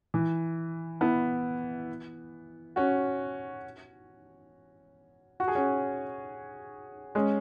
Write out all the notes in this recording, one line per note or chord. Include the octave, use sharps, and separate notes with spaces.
E3
B3 E4
C#4 F#4
F#4
G#4
C#4 F#4
G#3 C#4